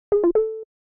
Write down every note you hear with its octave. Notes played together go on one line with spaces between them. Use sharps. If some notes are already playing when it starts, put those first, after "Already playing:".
G#4
F4
A4